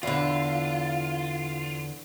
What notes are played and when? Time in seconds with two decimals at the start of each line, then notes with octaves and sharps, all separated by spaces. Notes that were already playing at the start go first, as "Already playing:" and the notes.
0.03 E2 D3 F4